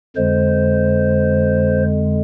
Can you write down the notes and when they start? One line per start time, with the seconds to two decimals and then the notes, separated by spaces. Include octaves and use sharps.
0.16 F2 D3 G#3 C5